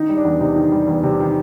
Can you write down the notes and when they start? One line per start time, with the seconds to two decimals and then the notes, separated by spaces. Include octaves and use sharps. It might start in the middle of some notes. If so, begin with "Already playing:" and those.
Already playing: D#3 D#4
0.09 G3
0.17 D4
0.25 E2
0.41 C3 D#4
0.56 D#3
0.72 G3
0.88 E2
1.03 C3
1.20 D#3